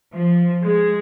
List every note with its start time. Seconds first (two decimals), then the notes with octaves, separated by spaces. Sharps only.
0.14 F3
0.63 G#3